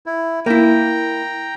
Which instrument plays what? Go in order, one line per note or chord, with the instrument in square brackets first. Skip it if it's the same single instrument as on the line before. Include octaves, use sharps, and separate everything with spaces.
[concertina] E4
[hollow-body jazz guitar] A#3 E4 [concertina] G5 A#5